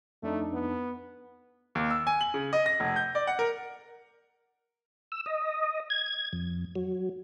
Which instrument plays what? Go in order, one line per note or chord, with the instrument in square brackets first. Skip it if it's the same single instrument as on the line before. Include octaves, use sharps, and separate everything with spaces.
[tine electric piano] F2 D4 D#4 [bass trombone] A3
[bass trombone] B3
[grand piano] D#2
E6
G#5
F#7
C#3
D#5
A#6
F1
G6
D5
F#5
A#4
[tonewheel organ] E6
D#5
G#6
F2
F#3